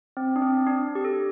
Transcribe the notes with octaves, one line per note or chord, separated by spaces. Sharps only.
C4
D4
C4
D4
G4
A4